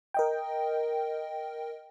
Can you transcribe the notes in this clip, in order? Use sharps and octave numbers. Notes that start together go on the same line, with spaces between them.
A#4 D#5 G5